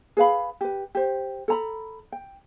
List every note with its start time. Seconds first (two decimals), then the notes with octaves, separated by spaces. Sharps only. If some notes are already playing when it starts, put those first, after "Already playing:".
0.17 G#4 B4 F5 B5
0.61 G4 B4
0.95 G4 C5
1.48 A4 A#5 B5
2.12 G5